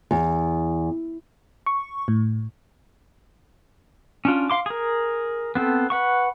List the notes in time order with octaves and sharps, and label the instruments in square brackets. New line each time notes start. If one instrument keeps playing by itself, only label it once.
[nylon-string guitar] E2
[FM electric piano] C#6
A2
[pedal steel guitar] C#4 D4 F4
F5 C6 D6
G#4 A#4
B3 C4 A4
B4 F#5 C#6